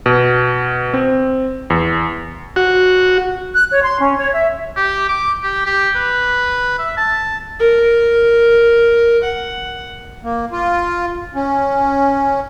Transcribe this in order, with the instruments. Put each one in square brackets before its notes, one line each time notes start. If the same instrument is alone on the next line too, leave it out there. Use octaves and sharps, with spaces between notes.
[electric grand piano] B2
C4
E2
[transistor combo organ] F#4
[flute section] F#6
C#5
C6
C#4
C#5
E5
[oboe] G4
D6
G4
G4
B4
E5
A5
[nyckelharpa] A#4
F#5
[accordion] A#3
F4
C#4